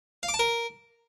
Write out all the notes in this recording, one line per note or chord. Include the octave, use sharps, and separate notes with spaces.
F5
D6
A5
A#4